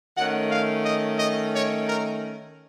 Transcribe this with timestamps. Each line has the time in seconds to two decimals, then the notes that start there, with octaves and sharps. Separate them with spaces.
0.17 D#3 A3 C#4 F#5
0.51 F5
0.85 D#5
1.19 D#5
1.53 C#5
1.87 A#4